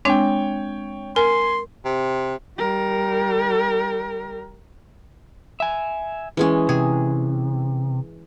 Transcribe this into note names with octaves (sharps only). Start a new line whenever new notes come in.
G#3 C4 D4 C#5 G5
A#4 G#5 C6
C3
G3 A#4
E5 G#5
E3 G#3 C#4
C3 G#4